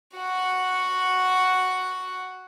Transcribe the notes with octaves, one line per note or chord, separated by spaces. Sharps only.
F#4 F#5